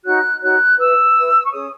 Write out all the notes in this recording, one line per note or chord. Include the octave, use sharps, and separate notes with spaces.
D#4 F#4 C#5 F#6
D#4 F#4 C#5 F#6
E4 B4 E6
E4 B4
C#6
C#4 G#4 C#5 D#6